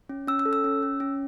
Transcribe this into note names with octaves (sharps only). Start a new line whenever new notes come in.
C#4
C#4 E6
E6
A4
E6
C#4
C#4
C#4